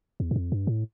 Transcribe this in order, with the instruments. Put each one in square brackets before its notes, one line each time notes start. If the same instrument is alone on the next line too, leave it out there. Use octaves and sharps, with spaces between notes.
[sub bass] E2
G2
F2
G2
A2